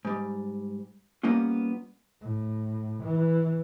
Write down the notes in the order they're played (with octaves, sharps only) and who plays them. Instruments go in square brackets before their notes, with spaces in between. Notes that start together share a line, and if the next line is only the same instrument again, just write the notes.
[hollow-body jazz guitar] G#2 G3
G3 A#3 B3 C#4 F4
[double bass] A2
E3